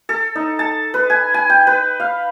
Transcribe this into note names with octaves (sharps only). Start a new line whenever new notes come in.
A4
D#4
A5
B4
G#5
G#5
G5
B4
F5